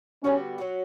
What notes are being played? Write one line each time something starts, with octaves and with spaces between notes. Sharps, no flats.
D3 G3 B3 C#4 F#4
F#3 C#4 F#4